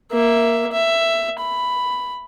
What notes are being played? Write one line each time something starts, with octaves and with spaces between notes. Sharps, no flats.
A#3 E5
E5
B5